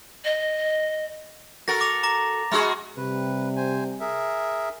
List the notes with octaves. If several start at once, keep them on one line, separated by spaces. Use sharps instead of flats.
D#5
F#4 A4 A#4 A6 A#6
D6 A#6 F7
A#5 D6 A#6
G#3 F#4 G#4 B5 F6
C3 G3 B4
C5 G#5
G#4 A#4 E5